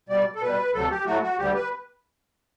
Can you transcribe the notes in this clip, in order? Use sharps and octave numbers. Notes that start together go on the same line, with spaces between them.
B2 G3 D5
A4
B2 G3 B4
D2 C3 F#3 A3 A4
G4
A2 F#3 A3 F#4
F#4
D2 D3 G3 G4
B4